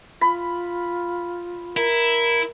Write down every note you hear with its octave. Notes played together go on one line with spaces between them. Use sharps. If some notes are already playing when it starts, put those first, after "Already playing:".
F4 B5
E4 A#4